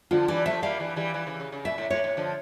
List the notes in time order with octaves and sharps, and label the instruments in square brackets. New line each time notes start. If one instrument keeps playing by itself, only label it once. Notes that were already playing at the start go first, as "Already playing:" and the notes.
[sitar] D3 F3 [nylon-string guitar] F4
[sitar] E3 G3 [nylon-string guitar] D5
[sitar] F3 A3 [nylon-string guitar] E5
[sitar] G3 A#3 [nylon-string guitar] F5
[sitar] E3 G3
E3 G3
E3 G3
C#3 E3
C#3
C#3
[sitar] A#2 [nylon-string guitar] E5
[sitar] A2
[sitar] A2 [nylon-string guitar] C#5
[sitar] A2
D3 F3